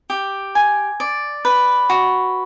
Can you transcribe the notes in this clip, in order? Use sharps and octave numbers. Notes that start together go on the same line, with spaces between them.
G4
G#5
D5
B4
F#4